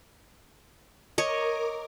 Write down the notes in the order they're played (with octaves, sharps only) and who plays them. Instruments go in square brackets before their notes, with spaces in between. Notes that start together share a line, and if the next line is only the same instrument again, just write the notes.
[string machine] A#4 D6 [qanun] C#5 D#5